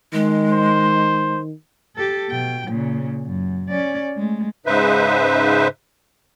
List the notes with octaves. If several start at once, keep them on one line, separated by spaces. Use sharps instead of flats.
D#3 G#3
C5
G4 A4
B2 G5
A#2 C#3
F#2
C#4 D5
G#3 A3
G#2 C#3 D#4 B4 C5 E5